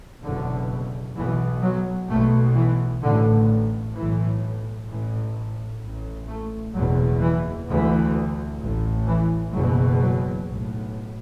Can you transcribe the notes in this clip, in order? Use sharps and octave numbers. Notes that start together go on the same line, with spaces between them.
F#1 E2 B2 D3
B1 B2 E3
F#3
B1 B2 A3
E3
A1 A2 D3
B1 A2 E3
A1 A2 E3
A1 A2
A3
F#1 E2 B2 F#3
E3
D2 E3
A1 A2
E3
F#1 E2 B2 F#3
F#3
B1 A2